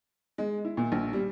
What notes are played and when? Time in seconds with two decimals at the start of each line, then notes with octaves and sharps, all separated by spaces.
0.38 G#3
0.65 E4
0.77 A#2
0.92 A#1
1.13 G3